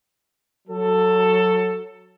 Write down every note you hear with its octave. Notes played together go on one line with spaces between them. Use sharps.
F#3 A4